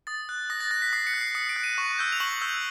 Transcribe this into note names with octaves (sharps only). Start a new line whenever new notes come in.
D#6 A6
F#6
D#6 A#6
A6
F#6 A#6
B6
D#6 C7
C#7
F#6
C7
D#6 C#7
D7
F#6
D#7
C#6
E6 G6
F7
C#6 F#7
E6 G6